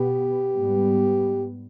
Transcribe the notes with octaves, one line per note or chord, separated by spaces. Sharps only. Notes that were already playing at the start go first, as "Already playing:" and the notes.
Already playing: B2 B3 G4
G#2 G3 B3